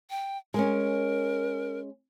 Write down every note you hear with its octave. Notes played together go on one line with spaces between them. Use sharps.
G5
G#3 C#4 A#4